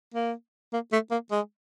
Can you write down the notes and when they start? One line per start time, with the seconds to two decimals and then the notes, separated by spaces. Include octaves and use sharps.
0.15 A#3
0.73 A#3
0.92 A3
1.11 A#3
1.31 G#3